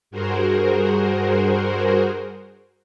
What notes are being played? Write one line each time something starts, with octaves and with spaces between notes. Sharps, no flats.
G2 F#4 G#4 A#4 C5